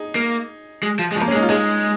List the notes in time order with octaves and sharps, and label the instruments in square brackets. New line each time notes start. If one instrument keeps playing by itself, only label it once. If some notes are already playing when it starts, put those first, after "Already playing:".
Already playing: [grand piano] D#4 G#4
[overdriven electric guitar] A#3
G#3
F3
G#3
F3
[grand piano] A#3
C#4
[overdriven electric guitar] G#3
[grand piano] D#4
F4
[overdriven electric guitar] G#3 [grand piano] D#4 G#4